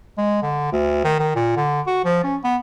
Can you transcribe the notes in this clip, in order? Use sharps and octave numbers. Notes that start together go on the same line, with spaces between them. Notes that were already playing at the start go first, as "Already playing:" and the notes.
G#3
D3
D2
D#3
D#3
A#2
D3
F#4
F3
C#4
B3